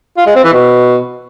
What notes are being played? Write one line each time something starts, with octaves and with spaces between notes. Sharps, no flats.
F4
G#3
C4
E3
B2